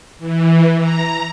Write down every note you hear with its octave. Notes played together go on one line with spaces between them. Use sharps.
E3
A#5